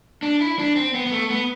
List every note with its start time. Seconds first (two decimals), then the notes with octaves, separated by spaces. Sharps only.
0.23 D4
0.41 E4
0.59 D4
0.76 C4
0.94 B3
1.06 B3
1.12 A3
1.30 B3